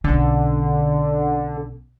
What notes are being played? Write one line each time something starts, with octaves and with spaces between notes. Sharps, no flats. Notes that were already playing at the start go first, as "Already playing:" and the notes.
B1 D3 C#4